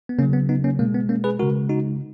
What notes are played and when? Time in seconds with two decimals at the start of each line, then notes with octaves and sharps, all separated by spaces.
0.09 B3
0.19 C#3 A#3 C#4
0.22 F#3
0.33 B3
0.49 B3 D#4
0.64 A#3 C#4
0.79 B2 G#3 A#3
0.94 B3
1.09 A#3 C#4
1.24 G#4 B4
1.39 C#3 G#3 F#4 A#4
1.70 D#4 F#4